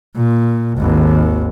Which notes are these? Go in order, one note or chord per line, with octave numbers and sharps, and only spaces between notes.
A#2
G#1 D#2